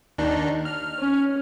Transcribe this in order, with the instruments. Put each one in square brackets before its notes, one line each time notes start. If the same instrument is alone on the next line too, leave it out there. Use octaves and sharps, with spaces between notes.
[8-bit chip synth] D#2 D4 D#4
F6
[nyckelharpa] C#4